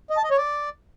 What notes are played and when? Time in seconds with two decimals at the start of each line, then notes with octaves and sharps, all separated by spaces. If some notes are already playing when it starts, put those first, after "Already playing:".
0.10 D#5
0.17 A5
0.24 D#5
0.31 C#5
0.37 D5